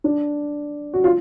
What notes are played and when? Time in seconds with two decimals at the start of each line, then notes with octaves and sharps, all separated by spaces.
0.04 D4
0.93 F#4
1.04 F4